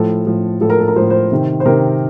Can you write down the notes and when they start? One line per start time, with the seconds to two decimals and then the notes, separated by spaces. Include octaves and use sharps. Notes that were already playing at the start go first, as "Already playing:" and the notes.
Already playing: A2 F3 A4
0.27 A2 F3
0.61 A2 F3 A4
0.70 A#4
0.79 A4
0.88 A#4
0.96 F3 C5
1.01 A2
1.10 C5
1.32 C3 D#3
1.60 C5
1.66 C3 D#3 A#4